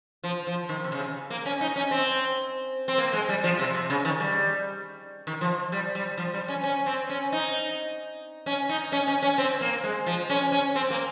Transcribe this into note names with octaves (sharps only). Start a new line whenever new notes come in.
F3
F3
D#3
C3
C#3
C3
A#3
C#4
D#4
C#4
C4
C4
A#3
G#3
G3
F3
C3
C3
C#3
D#3
G3
D#3
F3
G3
G3
F3
G3
C#4
C#4
C4
C#4
D#4
C#4
D#4
C#4
C#4
C#4
C4
A#3
G#3
F3
C#4
C#4
C4
A#3